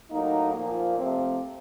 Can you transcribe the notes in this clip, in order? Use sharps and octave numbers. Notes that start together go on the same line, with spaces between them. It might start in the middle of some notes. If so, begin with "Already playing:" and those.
A2 F#3 A#3 D#4
A#2 F3 A#3
C3 F3 A3 C4